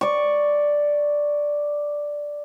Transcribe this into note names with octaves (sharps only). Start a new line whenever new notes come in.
D5 C#6